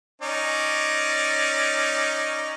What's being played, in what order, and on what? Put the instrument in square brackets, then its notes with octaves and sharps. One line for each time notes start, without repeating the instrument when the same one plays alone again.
[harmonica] C#4 D#4 D5